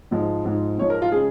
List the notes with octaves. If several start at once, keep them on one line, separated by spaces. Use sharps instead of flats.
G#2 F3 G#3
G#2 F3 G#3
G#2 F3 G#3 C#5
A#4
F4
C#3 G#3 G#4